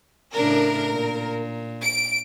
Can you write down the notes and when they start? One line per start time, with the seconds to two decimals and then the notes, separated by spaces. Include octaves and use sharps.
0.34 A2 C#3 D4 A#4
0.91 A#2
1.83 D7